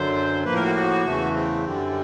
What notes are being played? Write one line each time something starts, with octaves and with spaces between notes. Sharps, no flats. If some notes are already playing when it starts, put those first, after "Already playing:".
Already playing: F#2 D3 F#3 C5
A2 F3 A#3 B4
A#4
F#4
F4
F#4
E2 C#3 E3 A3
C4
F#2 D3 G3